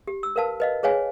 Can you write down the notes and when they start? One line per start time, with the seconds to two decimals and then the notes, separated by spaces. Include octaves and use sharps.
0.07 G4
0.23 E6
0.36 A#4 B4 F5 A5
0.60 B4 D#5 F5
0.83 G#4 B4 C#5 F5 G#5